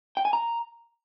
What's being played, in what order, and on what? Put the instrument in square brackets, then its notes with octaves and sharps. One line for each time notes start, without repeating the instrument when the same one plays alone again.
[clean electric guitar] G5
G#5
A#5